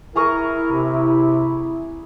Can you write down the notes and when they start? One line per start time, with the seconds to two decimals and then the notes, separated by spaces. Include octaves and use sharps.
0.16 E4 G#4 A#4 A#5 C#6
0.71 C3